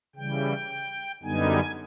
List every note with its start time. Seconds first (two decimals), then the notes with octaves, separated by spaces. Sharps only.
0.16 C#3 E3 G3 G5
1.23 F#2 D3 G3 B3 D#4 G#5